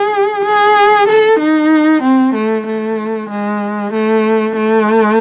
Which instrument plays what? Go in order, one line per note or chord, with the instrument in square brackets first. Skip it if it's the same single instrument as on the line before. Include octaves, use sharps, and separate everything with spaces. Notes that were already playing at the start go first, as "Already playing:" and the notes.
Already playing: [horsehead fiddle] G#4
G#4
A4
D#4
C4
A3
A3
G#3
A3
A3